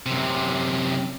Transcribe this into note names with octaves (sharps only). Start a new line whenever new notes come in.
F#2 C3